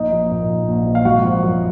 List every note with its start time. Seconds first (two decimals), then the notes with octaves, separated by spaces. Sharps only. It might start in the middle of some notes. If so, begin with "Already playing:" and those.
Already playing: A#1 D#4 D#5
0.12 F3
0.30 A#2
0.49 A#1
0.68 A#1
0.86 F3
0.95 F5
1.05 G#1 F#4 F#5
1.24 F3
1.43 F#2